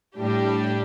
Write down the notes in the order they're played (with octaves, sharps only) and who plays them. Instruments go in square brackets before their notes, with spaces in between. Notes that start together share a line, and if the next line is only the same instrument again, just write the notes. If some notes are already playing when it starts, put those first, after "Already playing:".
[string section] A2 G3 D4 G4